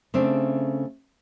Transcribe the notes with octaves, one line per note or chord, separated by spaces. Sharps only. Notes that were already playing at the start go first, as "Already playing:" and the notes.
C#3 A3 C4 D4